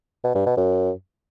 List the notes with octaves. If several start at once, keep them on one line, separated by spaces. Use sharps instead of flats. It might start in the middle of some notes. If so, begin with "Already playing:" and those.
B2
G2
B2
F#2